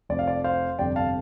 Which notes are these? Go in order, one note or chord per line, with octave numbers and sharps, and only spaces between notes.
F1 F2 F3 D5
F5
D5
C5 F5
G1 F2 C3 D5 G5
F5 A5